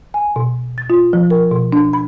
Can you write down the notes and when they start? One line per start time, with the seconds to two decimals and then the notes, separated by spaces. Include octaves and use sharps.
0.14 G#5
0.36 B2
0.78 A6
0.90 F4
1.13 F3
1.30 A#4
1.52 B2
1.72 D4
1.93 B5